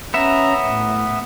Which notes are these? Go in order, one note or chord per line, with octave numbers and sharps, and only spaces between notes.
B3 C#4 E5 A#5
A2